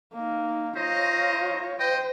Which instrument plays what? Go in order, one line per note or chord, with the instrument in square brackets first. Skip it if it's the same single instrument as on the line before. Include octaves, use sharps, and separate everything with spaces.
[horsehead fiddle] A#3 D#4
[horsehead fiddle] F4 C#5 [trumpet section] C5 D#5 A#5
[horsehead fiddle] C5 [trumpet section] D#5 G5